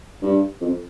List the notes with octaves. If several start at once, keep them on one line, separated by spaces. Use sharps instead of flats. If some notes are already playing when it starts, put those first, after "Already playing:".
G2
F2